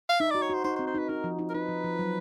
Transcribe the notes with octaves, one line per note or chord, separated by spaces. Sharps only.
F5
D#4 E5
F#4 D5
C#5
F#4 C5
D#4 C5
C5
C4
C5
D#4 B4
D#4 A#4
F3
D#4
A#4
D#4 B4
F3
F3
F#3